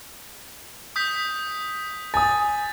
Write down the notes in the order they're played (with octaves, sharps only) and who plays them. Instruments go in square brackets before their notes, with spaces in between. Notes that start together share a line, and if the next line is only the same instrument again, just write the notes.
[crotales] D#6 G6 B6
[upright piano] G#5 D#6 [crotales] A6